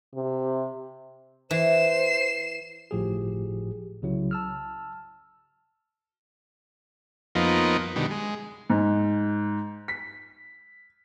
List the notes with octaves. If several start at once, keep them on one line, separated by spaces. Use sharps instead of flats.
C3
E3 C5 C7 E7
G1 A2 F3 G4 G#4
C2 C#3 F#3 E4
A5 E6 F6
F2 F3 A#3 B3 D#4
B2 D3 D#3 G3
G#3
G#2
B6